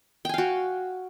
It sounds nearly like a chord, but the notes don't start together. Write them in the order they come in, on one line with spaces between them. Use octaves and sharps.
G5 G#5 F5 F#4